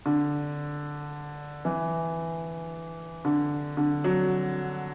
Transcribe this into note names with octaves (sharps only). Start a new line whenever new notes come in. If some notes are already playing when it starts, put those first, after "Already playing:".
D3
E3
D3
D3
F#3